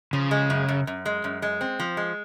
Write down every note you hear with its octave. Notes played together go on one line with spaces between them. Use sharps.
C#3 F3
G#3
F#2
F#2
F#2
G#3
F#2
G#3
C4
F3
G#3